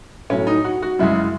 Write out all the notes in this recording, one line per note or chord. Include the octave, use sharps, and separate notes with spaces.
A2 F#3 A3 C#4
D#4
F#4
F#4
F#2 C#3 G#3 E4